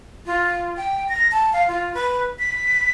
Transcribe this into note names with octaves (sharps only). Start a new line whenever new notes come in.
F4
G5
A#6
A5
F5
F4
B4
B6